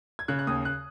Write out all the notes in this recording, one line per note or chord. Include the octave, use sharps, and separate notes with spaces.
G#6
C#3 F#6
F#6
D#2 D#6
F#6